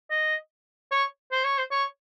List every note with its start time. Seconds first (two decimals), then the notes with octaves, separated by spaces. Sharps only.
0.10 D#5
0.91 C#5
1.32 C5
1.44 C#5
1.58 C5
1.71 C#5